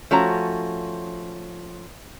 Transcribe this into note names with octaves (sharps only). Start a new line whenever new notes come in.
F3 A3 C#4 F#4 A#5